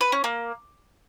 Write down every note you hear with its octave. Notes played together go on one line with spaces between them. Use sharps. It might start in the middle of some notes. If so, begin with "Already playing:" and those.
B4
C#4
A#3